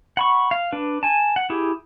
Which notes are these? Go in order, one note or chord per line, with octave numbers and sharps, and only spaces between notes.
F#5 B5 C#6
F5
D4 B4
G#5 A5
F#5
E4 G4 G#4